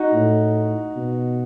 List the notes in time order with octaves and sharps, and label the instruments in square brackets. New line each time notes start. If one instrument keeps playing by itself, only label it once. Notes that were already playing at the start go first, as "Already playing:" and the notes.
Already playing: [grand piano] D#4 F#4
[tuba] A2
B2